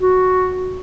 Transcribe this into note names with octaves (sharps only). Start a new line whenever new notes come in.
F#4